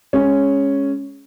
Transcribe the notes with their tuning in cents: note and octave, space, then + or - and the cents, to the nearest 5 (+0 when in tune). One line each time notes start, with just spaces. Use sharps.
G#3 +0 C#4 +0